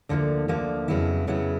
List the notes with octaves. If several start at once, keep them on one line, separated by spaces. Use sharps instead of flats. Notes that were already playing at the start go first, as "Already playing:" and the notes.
D2 D3 F3 A#3
D2 D3 F3 A#3
F2 C#3 F#3 B3 E4
F2 C#3 F#3 B3 E4